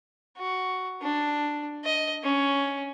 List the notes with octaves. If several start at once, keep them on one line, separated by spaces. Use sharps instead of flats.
F#4
D4
D#5
C#4